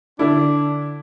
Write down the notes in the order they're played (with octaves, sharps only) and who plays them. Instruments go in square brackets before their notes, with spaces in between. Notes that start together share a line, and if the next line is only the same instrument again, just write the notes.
[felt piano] D3 E4 [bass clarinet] D4